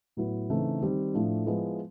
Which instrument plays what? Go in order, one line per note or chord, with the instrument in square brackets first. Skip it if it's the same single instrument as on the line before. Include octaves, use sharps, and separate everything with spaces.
[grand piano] A2 F#3 B3 E4
C#3 E3 A3 C4 D#4
D#3 G3 C4
A2 F3 A3 D4
F3 G#3 B3 E4